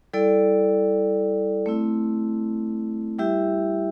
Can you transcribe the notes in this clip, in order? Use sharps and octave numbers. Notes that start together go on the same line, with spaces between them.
G3 E4 A4 D5
A3 C4 E4
G3 E4 G4 E5